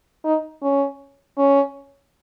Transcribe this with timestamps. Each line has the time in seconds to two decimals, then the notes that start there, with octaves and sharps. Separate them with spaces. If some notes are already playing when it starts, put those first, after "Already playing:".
0.24 D#4
0.62 C#4
1.38 C#4